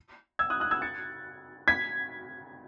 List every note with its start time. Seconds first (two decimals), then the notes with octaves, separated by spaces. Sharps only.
0.39 E6 G#6
0.50 D#6 F#6
0.60 D#6 F#6
0.71 E6 G#6
0.82 A6 C#7
1.68 G#6 B6